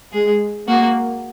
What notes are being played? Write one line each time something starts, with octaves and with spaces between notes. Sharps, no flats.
G#3 G#4
A#3 F#4